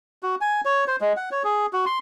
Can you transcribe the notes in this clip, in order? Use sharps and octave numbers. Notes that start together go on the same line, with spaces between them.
F#4
G#5
C#5
C5
G#3
F#5
C#5
G#4
F#4
C6